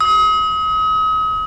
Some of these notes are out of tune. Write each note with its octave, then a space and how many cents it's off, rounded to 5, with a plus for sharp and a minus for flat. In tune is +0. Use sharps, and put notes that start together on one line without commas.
D#6 +40